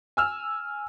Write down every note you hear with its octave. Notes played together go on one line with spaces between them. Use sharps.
G#5 E6 F6